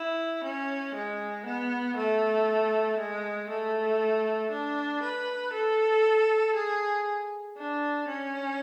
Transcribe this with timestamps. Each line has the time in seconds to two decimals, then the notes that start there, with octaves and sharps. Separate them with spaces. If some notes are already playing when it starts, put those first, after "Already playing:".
Already playing: E4
0.44 C#4
0.95 G#3
1.46 B3
1.96 A3
2.99 G#3
3.49 A3
4.51 D4
5.03 B4
5.53 A4
6.55 G#4
7.57 D4
8.08 C#4